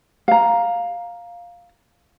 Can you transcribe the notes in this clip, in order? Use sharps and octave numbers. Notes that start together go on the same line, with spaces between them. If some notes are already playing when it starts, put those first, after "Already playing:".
F5 A#5